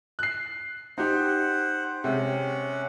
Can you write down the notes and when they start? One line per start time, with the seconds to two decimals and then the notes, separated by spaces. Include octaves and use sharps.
0.19 F#6 C7
0.98 D#4 G4 C5 F#5
2.04 C3 G#3 C#4 F#5